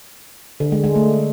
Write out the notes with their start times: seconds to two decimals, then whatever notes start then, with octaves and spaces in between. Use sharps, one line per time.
0.60 D3
0.72 G#3
0.84 G#3
0.95 A3